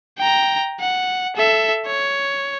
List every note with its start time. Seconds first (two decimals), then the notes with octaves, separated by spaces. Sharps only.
0.19 G5 A#5
0.80 F#5
1.36 A4 E5
1.86 C#5